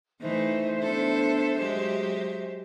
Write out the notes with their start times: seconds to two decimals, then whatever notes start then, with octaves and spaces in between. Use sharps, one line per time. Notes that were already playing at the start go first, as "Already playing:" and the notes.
0.21 E3 A3 D#4 C5 E5
0.82 B3 D4 A4
1.58 F#3 G#3 G4